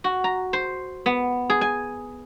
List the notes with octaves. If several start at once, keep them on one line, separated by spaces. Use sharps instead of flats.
F#4
A#5
C5
B3
G#4
G#5